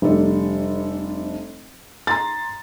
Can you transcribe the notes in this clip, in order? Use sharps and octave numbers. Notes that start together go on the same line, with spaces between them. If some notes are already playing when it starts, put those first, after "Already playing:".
F1 G3 D4 A4
A#5 C6 A6